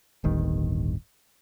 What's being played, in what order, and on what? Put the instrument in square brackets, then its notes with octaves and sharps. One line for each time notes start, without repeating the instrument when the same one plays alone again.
[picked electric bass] D1 G1 G2 D#3